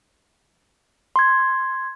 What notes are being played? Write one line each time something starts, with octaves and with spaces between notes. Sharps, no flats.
C6 G#6